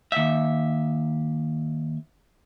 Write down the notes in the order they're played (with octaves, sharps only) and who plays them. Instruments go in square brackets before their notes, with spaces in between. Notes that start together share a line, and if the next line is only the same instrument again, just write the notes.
[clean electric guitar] D#2 E5